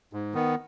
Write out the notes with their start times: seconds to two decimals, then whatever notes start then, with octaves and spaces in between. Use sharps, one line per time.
0.13 G#2
0.34 D#3 B3